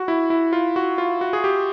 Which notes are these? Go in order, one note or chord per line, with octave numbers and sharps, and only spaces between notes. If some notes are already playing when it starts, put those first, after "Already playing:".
Already playing: F#4
E4
E4
F4
F#4
F4
F#4
G#4
G4